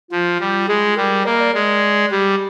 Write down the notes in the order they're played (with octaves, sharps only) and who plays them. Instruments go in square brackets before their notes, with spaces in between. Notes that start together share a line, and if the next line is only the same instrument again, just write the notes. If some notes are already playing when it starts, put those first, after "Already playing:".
[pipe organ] F3 [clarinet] F4
[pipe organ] G3
[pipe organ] G#3 [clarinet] G#4
[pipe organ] G3 [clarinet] A#4
[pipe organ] A#3 [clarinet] D#5
[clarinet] D5
[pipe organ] G#3 [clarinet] D5
[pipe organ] G3 [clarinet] G4